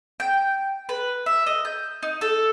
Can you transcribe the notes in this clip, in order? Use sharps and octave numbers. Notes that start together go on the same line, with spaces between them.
G5
B4
E5
D#5
G6
D#4
A4